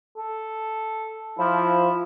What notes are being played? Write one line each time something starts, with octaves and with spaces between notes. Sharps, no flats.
A4
F3 E4